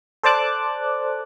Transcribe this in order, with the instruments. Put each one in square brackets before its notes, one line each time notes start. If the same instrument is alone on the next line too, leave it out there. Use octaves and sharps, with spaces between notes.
[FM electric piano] A4 C5 D5 A5 D6 F#6